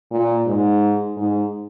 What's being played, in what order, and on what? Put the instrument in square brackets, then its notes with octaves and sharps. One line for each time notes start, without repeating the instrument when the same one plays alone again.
[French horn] A#2
G#2
G#2